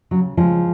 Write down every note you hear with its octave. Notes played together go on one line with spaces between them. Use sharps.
C#3 F#3
C#3 F3 G#3